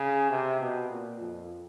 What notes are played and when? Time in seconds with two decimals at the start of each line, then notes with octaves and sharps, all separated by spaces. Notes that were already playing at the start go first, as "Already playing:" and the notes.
Already playing: C#3
0.30 C3
0.61 B2
0.90 A#2
1.20 F2